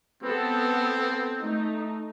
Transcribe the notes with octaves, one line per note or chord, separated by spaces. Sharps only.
B3 C4 A4
A3 D#4